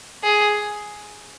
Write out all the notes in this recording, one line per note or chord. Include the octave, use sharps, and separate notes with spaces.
G#4